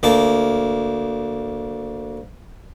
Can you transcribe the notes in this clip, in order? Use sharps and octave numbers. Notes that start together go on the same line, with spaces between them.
D2 A#3 A5